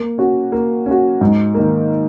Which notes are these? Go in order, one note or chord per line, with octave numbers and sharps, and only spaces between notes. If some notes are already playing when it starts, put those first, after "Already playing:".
Already playing: A#3
C#4 F#4
A#3
C#4 F#4
G#2
D#3 A#3